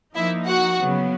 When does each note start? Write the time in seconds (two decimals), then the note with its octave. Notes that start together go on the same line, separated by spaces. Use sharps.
0.15 F3 A#3 D#4 E4 E5
0.46 F#4 F#5
0.79 C#3 F#3 B3